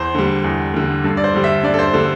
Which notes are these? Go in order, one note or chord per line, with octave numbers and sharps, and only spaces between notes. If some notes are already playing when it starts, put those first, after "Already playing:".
Already playing: E2 C5
D3 G3
E2
D3 G3
G2 A4
D5
C5
D3 G3
E5
G2 D5
A4
C5
D3 G3 A4